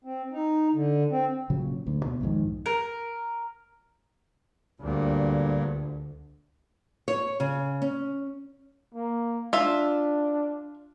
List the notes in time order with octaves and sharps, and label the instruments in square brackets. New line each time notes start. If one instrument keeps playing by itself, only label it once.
[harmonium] C4
D#4
D3
C4
[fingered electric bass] A#2 C#3 F#3
D2
B2
B1 F2 G#2 D#3
[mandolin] A#4
[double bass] D2 [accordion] G2 A#2
[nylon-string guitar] C#5
C#3
C#4
[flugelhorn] A#3
[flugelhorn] D4 [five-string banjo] F4 E5